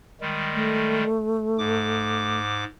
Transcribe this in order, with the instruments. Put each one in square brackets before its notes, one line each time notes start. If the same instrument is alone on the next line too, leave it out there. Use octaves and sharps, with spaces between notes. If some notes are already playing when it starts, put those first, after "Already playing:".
[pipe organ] D#3 G3 G#3
[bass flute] A3
[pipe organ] G#2 D6